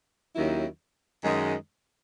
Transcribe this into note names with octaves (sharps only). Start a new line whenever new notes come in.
D#2 D#3 F#3 C#4 E4
F#2 D#3 G#3